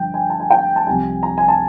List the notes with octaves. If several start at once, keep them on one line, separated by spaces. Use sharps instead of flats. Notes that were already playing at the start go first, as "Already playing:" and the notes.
Already playing: G2 D3 F3 G5
G#5
A5
G#5
G5
A5
C2 C3 F3 G#5
A#5
G#5
A5